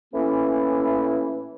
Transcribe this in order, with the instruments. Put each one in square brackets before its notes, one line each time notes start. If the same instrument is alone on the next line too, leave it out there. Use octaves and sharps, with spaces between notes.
[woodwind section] A2 E3 A#3 C#4 E4